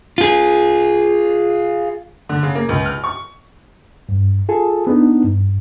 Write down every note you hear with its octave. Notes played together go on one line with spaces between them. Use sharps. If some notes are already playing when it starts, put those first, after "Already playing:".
F4 G#4
D3
C#3
A#3
C#2
F6
C#6
G2
F4 G#4 A4
B3 D4 D#4
G2